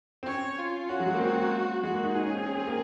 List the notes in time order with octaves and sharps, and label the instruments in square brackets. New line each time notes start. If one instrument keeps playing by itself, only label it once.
[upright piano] C4
[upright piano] C#4 [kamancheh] C#5
[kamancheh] F4
[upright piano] C#4 [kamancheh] F#4
[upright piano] F#3
G#3
A#3
C4
[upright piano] G#3 [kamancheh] F#4
[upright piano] A#3
D#4
[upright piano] D#4 [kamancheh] G#4
[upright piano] C#4
C4
C#4
C4
A#3